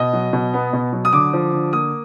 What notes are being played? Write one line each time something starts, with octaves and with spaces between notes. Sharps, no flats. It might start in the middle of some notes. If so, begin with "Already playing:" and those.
Already playing: B2 D#5
F#3
B2
B3
B2
F#3
D#6
D3 D6
F3
D3
A#3 D#6